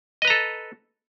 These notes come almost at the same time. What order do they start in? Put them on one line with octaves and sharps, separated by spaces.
D#5 B4 A#5 A4